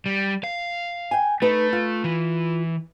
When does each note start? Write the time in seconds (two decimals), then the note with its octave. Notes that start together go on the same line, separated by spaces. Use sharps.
0.06 G3
0.44 F5
1.11 G5 G#5
1.42 A3 D#4 B4
1.73 F4
2.04 E3